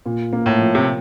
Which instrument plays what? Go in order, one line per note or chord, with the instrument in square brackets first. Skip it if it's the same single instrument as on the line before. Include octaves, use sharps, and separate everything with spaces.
[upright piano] A#2
A#3
[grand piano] A2
[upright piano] F3
[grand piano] C3